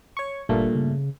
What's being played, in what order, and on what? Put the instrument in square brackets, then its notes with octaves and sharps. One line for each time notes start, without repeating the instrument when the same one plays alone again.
[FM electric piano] C#5 C#6
[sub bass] G1 [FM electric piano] G2 A#2 A3
[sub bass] C#3